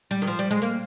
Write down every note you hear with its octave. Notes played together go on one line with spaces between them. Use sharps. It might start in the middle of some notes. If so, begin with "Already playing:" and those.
G3
D#3
F3
G3
G#3
A#3